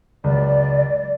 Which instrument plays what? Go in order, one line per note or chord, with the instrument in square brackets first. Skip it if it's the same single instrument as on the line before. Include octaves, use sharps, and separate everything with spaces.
[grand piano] C#2 F#3 [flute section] D5